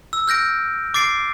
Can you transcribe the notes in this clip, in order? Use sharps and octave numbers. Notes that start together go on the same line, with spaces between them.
E6
F6 G6 A#6 D7
D6 A6 C7 D7